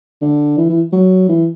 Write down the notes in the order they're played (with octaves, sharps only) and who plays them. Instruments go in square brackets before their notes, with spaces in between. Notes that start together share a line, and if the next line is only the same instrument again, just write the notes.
[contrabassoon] D3
E3
E3
F#3
E3